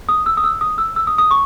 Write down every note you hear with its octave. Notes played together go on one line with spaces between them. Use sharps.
D#6
E6
D#6
E6
D#6
E6
E6
D#6
D#6
C#6